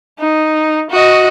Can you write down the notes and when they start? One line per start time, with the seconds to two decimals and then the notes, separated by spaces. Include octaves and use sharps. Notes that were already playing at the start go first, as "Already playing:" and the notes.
0.19 D#4
0.91 F#4 D#5